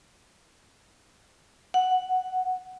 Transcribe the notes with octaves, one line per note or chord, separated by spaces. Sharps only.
F#5